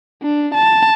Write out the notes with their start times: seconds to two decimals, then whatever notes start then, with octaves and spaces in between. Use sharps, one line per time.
0.23 D4
0.55 A5